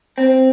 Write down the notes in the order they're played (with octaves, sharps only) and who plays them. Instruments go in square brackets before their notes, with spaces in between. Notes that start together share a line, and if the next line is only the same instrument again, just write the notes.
[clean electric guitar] C4